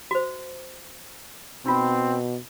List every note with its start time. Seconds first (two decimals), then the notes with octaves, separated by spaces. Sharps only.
0.11 F#4 C5
1.66 B2 C4 D#4 F4